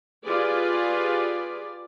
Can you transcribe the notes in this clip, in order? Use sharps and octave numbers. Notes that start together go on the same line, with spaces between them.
F4 G4 G#4 B4 D5